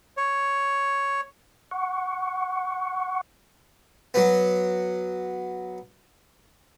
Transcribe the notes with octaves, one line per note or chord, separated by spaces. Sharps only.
C#5
F#5 C#6
F#3 B3